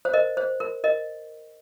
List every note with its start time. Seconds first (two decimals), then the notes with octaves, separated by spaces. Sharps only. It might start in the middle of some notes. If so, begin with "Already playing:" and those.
0.05 C5
0.13 A#4 D#5
0.37 C5
0.60 A#4
0.84 A#4 D#5